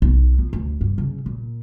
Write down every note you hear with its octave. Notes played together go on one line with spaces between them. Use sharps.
B1
F3
D2
G2
C#3
A#2